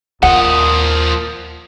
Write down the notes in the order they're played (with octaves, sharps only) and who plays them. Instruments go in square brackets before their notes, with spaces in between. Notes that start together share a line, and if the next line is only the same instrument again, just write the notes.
[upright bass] D#2 [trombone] A#2 [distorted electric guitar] F3 D#5 [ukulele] F#5